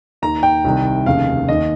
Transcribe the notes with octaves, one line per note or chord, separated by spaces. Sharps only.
D#2 D#3 A#5
G5
C2 C3 D#3
F1 D#2 C#3 F5
D#2 D#3 D#5